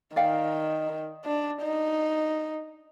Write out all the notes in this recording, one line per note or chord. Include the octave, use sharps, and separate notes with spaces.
D#3 D5 F5 G5
D4
D#4